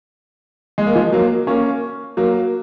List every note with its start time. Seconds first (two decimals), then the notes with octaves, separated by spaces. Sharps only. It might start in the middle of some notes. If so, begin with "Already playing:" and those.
0.78 G#3
0.87 A#3
0.95 F3 G#3
1.12 F#3 A#3
1.47 A#3 C#4
2.17 F#3 A#3